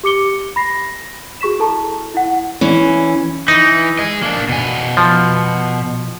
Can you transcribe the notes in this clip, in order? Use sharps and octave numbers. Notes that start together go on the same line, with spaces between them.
G4 D6 C#7 G7
B5 A#6 C7
F#4 G#4 C#6 B6 E7
E4 A4 A5 A#5 C#6
E4 F#5
E3 C#4
E3 D#4
G#4 D#5
A#3 D4
B2 G#5
F3